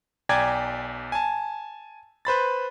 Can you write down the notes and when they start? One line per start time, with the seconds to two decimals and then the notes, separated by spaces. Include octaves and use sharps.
0.29 B1 D5 G5 G#5 A#5 G#6
1.12 G#5 A5
2.25 B4 C5 B5 A6